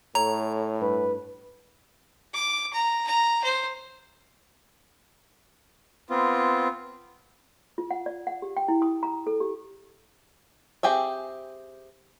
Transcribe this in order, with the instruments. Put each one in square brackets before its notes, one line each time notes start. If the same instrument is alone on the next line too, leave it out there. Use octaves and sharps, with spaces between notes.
[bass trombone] A2 [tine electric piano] A4 C#5 [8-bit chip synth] A#5
[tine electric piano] G2 [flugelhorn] B4
[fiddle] D6
A#5
A#5
C5
[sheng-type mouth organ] B3 C4 F4
[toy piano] F4
F#5
D5
F#5
G4
G5
E4
D#6
A#5
A4
G4
[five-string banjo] C4 G4 G#4 E5